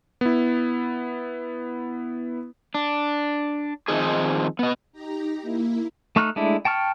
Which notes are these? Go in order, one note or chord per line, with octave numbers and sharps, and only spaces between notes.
B3 E4
D4
D#3 F3 C4 D#4 G#4
B3 D#5
D#4 G4 A#5
A#3 E4
A3 D#4 C#6 F6 F#6
G#3 A3 D4 E4
G5 A5 C#6 F6